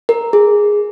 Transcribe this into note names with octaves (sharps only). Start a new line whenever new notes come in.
A#4
G#4